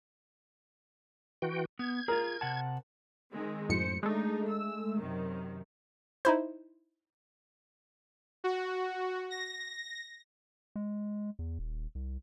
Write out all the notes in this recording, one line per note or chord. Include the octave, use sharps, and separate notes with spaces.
E3 F#4 G5
B3 G#6
F4 G#4 A#4
C3 F#5 A5
D#3 G#3 C4
F#2 A2 C5 C#7
G#3 A3 D4 D#4
E6
F#2 C3 D#3
D#4 E4 C5
F#4
A#6
G#3
E2
D#1
C2